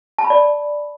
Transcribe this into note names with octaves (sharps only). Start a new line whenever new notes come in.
A5
B5
D5